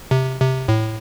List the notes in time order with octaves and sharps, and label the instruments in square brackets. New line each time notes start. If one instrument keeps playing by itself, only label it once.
[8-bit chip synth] C3
C3
A2